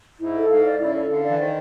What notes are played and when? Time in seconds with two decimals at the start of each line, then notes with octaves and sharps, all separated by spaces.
0.20 G#2 E4
0.35 A4
0.50 G#2 F5
0.66 D5
0.79 C#3 E4
0.95 A4
1.09 D3 F5
1.24 D5
1.29 E3
1.38 D#3 C5